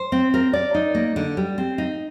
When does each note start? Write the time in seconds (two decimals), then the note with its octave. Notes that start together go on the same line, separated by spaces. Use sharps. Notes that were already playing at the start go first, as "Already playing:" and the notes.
Already playing: C5
0.12 C4
0.34 A#4
0.53 D5
0.74 D#4
0.95 A#3
1.16 D3
1.37 G3
1.58 C4
1.78 D#4